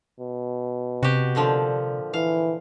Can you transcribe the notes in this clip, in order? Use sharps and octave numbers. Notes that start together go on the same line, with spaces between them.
B2
C3 F#4 G4
A#2 D3 F3
E3 F5